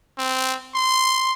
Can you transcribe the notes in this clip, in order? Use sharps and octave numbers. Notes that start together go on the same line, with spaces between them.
C4
C6